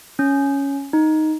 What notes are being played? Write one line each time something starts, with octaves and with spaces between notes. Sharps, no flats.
C#4
D#4